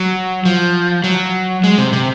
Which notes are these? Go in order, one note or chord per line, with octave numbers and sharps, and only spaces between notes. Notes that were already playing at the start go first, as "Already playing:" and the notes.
Already playing: F#3
F3
F#3
G#3
C3
C3